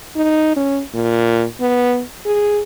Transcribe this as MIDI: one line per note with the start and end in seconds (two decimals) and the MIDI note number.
0.16 0.54 63
0.56 0.82 61
0.94 1.45 46
1.60 2.02 59
2.26 2.62 68